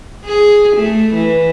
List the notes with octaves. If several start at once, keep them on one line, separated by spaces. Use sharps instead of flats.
G#4
A3
E3